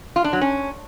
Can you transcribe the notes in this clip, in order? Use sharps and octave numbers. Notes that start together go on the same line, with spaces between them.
F4
D4
F#3
C#4